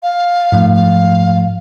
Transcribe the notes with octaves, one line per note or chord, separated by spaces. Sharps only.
F5
G#2 F3 A3
F5